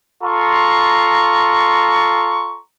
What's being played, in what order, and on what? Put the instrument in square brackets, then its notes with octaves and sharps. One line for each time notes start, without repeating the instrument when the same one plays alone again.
[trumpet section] F4 A4 A#5 C6 C#6